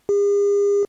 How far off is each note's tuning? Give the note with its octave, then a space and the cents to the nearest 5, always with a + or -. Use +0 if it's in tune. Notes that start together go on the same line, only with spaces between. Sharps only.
G#4 -45